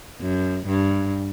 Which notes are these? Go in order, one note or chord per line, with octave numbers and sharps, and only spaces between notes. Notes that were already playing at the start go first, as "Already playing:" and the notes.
F#2
G2